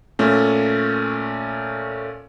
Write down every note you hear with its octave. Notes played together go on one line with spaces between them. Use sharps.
A#2 A3 C#4